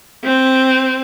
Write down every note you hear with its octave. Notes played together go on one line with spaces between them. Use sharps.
C4